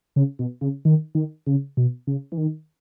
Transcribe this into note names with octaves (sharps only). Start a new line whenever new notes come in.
C#3
B2
C#3
D#3
D#3
C#3
B2
C#3
E3
D#3